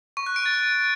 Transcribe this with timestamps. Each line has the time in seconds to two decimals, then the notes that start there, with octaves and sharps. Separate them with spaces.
0.17 C#6
0.26 F#6
0.36 D7
0.46 A6